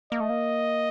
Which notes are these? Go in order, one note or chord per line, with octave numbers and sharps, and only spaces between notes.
A#3 D#5
A3
A#3